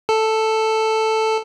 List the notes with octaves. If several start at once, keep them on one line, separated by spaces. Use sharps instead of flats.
A4